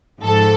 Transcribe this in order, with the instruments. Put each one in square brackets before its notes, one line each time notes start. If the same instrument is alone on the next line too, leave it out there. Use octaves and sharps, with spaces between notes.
[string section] G#2 F3 A4